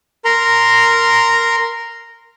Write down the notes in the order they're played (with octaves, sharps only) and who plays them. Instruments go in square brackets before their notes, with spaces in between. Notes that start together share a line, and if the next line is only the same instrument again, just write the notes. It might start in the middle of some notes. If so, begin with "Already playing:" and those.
[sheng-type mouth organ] A#4 A#5 C6